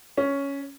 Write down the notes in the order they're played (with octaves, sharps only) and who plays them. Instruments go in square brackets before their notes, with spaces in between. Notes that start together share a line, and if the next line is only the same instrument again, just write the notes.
[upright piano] C#4